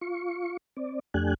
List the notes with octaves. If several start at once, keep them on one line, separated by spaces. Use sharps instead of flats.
F4 C#6
C4 D5
F2 A3 D4 G4 G#5 F#6